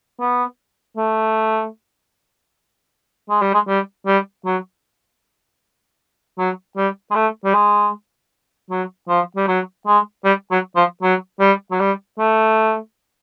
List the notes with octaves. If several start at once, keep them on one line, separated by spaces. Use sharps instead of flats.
B3
A3
G#3
G3
G#3
G3
G3
F#3
F#3
G3
G#3
A3
G3
G#3
F#3
F3
G3
F#3
G#3
G3
F#3
F3
F#3
G3
F#3
G3
A3